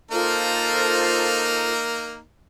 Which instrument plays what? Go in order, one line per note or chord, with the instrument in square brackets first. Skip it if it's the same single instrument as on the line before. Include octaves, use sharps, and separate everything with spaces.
[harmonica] A#3 D#4 A#4 [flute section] F4 A4 C5